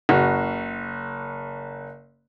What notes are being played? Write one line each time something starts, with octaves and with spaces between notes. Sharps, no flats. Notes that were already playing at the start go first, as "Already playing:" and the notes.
F#1 F#4